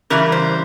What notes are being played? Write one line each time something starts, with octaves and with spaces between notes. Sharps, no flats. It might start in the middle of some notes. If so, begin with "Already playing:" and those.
C#3 E3 G3 A#4
C5